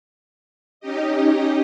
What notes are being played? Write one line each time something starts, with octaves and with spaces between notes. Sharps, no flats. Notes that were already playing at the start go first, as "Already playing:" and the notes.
C#4 D#4 G4 D#5